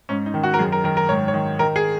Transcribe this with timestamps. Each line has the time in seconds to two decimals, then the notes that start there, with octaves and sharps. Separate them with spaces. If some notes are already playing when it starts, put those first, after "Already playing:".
0.09 G#2 C#4
0.26 D#4
0.34 D#3
0.43 F#4
0.54 A#4
0.59 F#2 G#4
0.72 A#4
0.84 D#3 A#4
0.97 A#4
1.09 G#2 C#5
1.28 C#5
1.34 D#3
1.59 D#3 A#4
1.76 G#4